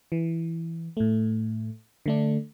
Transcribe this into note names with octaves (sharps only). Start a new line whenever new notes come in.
E3
A2 A3
D3 A3 D4